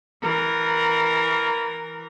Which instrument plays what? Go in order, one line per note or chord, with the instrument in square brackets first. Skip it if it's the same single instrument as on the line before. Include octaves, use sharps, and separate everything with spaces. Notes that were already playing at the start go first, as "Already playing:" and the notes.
[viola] E3 A#4